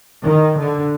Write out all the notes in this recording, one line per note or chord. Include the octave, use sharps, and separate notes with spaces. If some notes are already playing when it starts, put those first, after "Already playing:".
D#3
D3